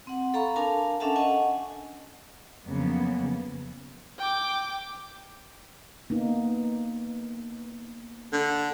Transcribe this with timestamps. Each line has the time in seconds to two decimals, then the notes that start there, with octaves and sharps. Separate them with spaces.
0.07 C4 F#5
0.34 A4 F5 A#5 B5 C#6
0.56 D4 A#4 F5 G#5 A5
1.00 C#4 D4 A4 E5 F#5 A5
1.15 D#5 F#5 G#5 C#6
2.65 F2 C#3 F#3 A#3 B3
4.18 G5 D6
6.10 A#3 B3 D#4
8.33 D3